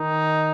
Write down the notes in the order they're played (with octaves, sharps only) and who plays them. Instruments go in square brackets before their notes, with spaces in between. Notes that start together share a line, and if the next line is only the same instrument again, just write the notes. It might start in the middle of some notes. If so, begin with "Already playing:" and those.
Already playing: [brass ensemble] D#3 D#4